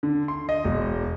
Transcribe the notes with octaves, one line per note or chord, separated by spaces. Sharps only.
D3
C6
D#5
E1